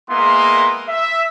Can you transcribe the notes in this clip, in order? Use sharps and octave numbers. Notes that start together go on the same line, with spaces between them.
G#3 A#3 B3 E4 C6 D#6
E5